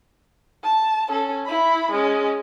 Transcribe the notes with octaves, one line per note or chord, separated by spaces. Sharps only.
A5
C#4 A4
E4 B5
G#3 C#4